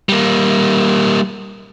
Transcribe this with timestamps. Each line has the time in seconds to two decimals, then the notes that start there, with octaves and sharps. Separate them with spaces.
0.09 G3 A#3